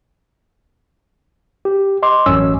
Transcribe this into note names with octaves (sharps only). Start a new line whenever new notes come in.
G4
D#5 C6 D6
A1 F#2 C#4 E6